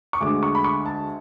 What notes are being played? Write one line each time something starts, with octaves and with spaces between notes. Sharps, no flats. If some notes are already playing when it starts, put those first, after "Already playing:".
C#6
D2 D3 G#3 D6
C#6
B5
C#6
A5